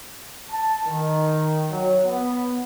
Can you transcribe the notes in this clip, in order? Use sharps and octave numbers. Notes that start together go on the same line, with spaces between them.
A5
D#3
F#3
B3